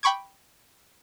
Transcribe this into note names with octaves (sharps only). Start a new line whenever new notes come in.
G5 B5 C#6 D6 G#6